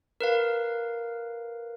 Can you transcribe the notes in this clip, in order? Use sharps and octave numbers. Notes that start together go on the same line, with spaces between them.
A#4 B4 F5